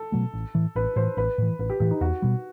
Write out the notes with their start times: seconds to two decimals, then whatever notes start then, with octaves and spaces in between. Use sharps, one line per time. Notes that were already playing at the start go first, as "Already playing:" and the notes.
Already playing: A4
0.12 B2 F#3 A3
0.34 A1
0.55 A2 E3
0.75 A1 B4
0.96 A2 E3 C5
1.17 A1 B4
1.38 A2 E3
1.59 A1 B4
1.70 G4
1.80 A2 E3 G4
1.91 D#4
2.01 E2 F#4
2.22 B2 G3